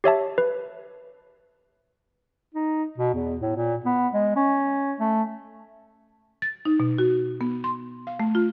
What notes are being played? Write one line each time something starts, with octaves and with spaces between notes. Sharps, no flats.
G4 C#5 E5 A5
B4
D#4
B2
E2
A2
A#2
B3
G#3
C#4
A3
A6
D#4
B2
F#4
B3
C6
F5
A3
F4